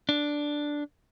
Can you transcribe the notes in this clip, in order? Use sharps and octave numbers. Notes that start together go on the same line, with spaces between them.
D4